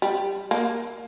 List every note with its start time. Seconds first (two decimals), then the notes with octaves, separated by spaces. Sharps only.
0.02 G3
0.51 A#3